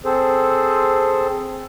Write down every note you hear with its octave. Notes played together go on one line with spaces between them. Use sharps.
C4 G#4 A4 C5